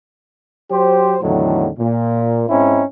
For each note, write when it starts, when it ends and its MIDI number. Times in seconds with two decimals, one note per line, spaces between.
0.71 1.17 54
0.71 1.17 67
0.71 1.17 72
1.22 1.69 40
1.22 1.69 45
1.22 1.69 50
1.22 1.69 51
1.22 1.69 54
1.79 2.44 46
2.49 2.83 44
2.49 2.83 60
2.49 2.83 61
2.49 2.83 63
2.49 2.83 64